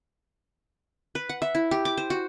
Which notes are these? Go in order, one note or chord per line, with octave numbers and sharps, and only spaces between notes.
B4
F#5
E5
E4
G4
D6
C5
F#4